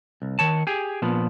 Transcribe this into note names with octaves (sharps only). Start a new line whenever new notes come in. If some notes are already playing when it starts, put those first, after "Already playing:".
C2
D#3 C#5 A5
G4 G#4
A#2 F3 B3